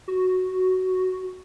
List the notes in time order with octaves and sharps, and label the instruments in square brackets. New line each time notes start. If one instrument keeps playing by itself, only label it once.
[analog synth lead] F#4